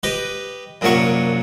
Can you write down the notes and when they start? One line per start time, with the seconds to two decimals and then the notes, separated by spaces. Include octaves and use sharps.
0.03 G4 B4 D#5
0.81 C2 F#2 A#2 D4 F#5 C#6